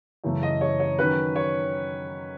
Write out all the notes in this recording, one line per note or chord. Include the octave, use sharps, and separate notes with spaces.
F#2 C#3 E3 A3
D#5
C#5
C#5
D#3 F#3 C#4 B4
C#5